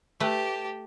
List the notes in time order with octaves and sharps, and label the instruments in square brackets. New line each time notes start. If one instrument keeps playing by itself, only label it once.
[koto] A3 B4 [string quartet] G4 A5